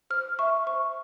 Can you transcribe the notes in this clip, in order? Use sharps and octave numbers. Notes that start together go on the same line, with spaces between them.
C5 F6
E5 C#6
C5 C#6